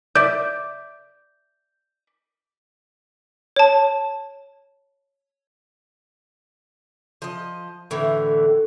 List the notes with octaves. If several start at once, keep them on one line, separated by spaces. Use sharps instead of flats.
D5 E5 G6
C#5 A5
F3 D#5
A2 D3 E3